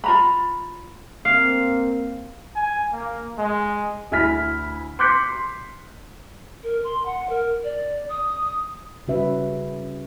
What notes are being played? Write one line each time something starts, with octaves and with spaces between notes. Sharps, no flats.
F4 A#5 B5
A#3 C4 F5
G#5
A#3
G#3
D2 E4 G#5 F6 B6
C6 D6 F#6 G6 B6 C#7
C6
A#4
C6
F#5
A#4
D5
D#6
C#3 G3 C#4 F#4 B4 E5